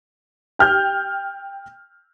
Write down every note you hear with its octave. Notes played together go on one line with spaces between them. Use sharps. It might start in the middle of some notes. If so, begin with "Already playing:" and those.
G5 F6 G6